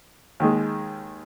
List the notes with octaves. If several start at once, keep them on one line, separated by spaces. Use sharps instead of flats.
D#2 D#3 G#3